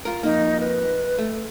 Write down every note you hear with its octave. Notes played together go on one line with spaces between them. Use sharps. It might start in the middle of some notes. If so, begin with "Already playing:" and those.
F4 A#4
F2 A#3 D#4
B4
A3